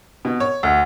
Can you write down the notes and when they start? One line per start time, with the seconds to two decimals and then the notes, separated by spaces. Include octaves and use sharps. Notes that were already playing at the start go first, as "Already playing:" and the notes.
0.25 B2
0.40 C#5
0.63 D2